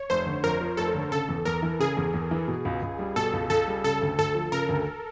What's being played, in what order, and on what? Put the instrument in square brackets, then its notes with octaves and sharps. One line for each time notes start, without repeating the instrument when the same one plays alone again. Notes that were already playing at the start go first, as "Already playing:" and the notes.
Already playing: [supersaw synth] C#5
[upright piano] F1 [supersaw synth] C5
[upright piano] D3
[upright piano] F2 [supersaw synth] A#4
[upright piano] F3
[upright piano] F1 [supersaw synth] A4
[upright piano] D3
[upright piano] C#3 [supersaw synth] A4
[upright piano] E2
[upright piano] E2 [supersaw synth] A#4
[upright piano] E3
[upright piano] C#3 [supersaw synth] G#4
[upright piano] E2
E2
E3
B2
C#2
C#2
G3
[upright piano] B2 [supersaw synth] A4
[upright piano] C#2
[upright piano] C#2 [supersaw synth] A4
[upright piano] G3
[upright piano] C#3 [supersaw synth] A4
[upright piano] D2
[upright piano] D2 [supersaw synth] A4
[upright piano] F3
[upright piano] C#3 [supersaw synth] A#4
[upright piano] D2